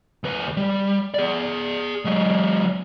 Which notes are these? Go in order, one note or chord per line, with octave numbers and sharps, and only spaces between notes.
D#2 B4
G3
G#4 D5
F#3 G#3